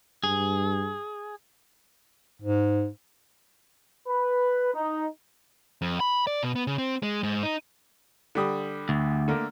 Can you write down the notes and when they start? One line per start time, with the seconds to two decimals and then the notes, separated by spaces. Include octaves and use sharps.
0.24 G2 G#4
2.42 G#2
4.08 B4
4.74 D#4
5.82 F2
6.00 B5
6.27 D5
6.43 B2
6.56 B3
6.67 C#3
6.78 C4
7.03 G#3
7.23 G#2
7.43 D#4
8.35 D3 G3 D#6
8.89 D2
9.28 D3 A3 A#3